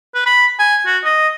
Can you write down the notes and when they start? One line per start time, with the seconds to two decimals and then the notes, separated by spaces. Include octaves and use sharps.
0.14 B4
0.26 B5
0.59 G#5
0.86 F#4
1.04 D#5